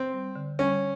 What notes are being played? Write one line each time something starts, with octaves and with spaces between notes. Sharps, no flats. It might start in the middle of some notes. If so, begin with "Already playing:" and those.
Already playing: C4
G3
D3
G3 C#4